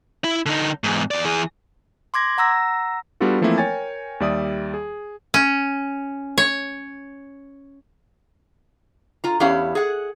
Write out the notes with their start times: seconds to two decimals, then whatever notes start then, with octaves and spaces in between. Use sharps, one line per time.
0.24 E4
0.46 D3 D#4
0.84 E2 G#2
1.11 E2 D5
1.25 E3 G#4
2.14 C6 D6 G#6 A#6
2.38 F#5 A#5 E6 A#6
3.20 G3 B3 D4 F4 F#4 A4
3.41 E3 F3 A3 A#3 C4 E4
3.58 A#4 C#5 G5 G#5 A6
4.20 D#2 G3 D5 E5 D#6
4.74 G#4
5.34 C#4
6.38 C#5
9.24 F4 A#5
9.40 E2 C#4 E4 G4 F5
9.75 G#4 F#5